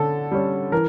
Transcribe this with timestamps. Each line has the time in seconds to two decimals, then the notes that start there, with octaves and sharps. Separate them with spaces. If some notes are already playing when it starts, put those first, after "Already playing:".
Already playing: D3 C#4 A4
0.32 G3 C#4
0.72 E3 A#4